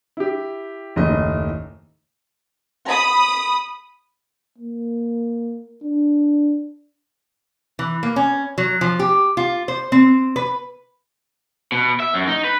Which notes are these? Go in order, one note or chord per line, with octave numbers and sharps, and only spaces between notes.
E4 G4
F#1 D#2 A2 D#3 A3 D#5
B5 D#6
A#3
D4
E3
A#3
C#4
F#3
F3
G4
F4
C5
C4
B4
B2
E5
F#2
D#4
B4